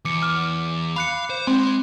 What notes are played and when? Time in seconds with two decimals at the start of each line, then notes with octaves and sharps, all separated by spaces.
0.05 E2 D6 C#7
0.22 D6 F6
0.96 F5 B5 F#6 C#7
1.30 C5
1.47 G#3 C4